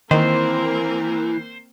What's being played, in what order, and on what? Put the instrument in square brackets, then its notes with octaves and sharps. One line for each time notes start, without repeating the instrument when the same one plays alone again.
[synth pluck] D#3 [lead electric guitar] E3 [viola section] A#3 C4 A#4 [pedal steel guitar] C5